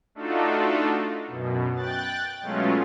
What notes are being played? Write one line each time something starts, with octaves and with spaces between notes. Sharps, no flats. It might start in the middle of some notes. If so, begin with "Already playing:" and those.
A3 D4 D#4 F4 F#4 A4
F#2 B2
G5 F#6 A6
B2 F#3 G#3 A3 C#4 F4